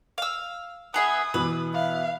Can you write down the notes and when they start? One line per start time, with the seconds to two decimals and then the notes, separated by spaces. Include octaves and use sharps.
0.18 F5 E6
0.94 B3 G#4 E5 D#6
1.34 B2 E3 B3 B4
1.74 E5 F5